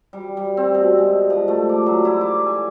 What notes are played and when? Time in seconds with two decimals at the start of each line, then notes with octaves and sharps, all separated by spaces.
0.13 G3
0.37 G3
0.57 C4
0.74 B2
0.98 G#3
1.30 F3
1.48 A3
1.69 D5
1.86 F#3
2.05 E4
2.21 D6
2.46 G#5